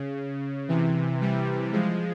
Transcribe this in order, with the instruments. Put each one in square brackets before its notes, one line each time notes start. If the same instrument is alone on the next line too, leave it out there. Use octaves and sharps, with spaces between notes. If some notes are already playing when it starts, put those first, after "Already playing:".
Already playing: [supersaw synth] C#3
C3 E3
E3 G3
F3 G#3